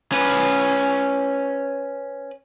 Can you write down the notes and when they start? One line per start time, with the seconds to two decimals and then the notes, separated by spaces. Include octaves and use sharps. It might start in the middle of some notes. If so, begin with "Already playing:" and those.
0.12 C#4 B4